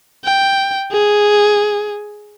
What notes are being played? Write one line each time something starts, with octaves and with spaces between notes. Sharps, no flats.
G5
G#4